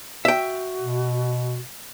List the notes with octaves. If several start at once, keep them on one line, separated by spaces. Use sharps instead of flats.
F#4 E5 G5
B2